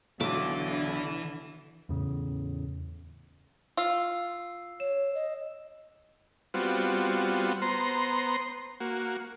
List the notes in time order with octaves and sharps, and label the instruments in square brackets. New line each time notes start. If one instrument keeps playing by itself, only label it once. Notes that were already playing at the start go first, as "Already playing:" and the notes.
[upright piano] B1 [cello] D3 [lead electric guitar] E3 E4 [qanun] D6
[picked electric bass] E2 A2 C#3
[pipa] F4 [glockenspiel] E6 C7
[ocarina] C#5 [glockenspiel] E7
[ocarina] D#5
[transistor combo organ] G3 B3 C4 F4 F#4
B3 C5 A#5 C6
A#3 F#4